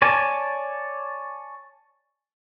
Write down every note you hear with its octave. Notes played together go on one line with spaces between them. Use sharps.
C#5 D5 G#5 A5